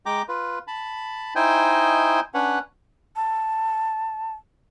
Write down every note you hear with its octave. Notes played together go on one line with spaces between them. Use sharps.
G#3 G5 A#5 D6
F4 B4
A5 B5
D#4 E4 C5 D#5 G5 G#5
C#4 D4 B4 C#5 F#5
A5